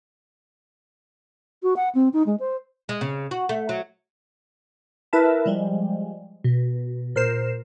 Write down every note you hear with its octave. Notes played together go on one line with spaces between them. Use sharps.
F#4
F#5
C4
D#4
G#3
C5
G#3
C#3
F#4
A3
F#3
E4 A#4 B4 E5 A5
F3 G3 G#3
B2
A#2 A#4 C5 C7 E7